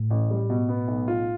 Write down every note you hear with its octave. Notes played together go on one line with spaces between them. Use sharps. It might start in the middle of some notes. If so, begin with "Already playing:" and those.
Already playing: A2
A1
G3
B2
B3
B1
F4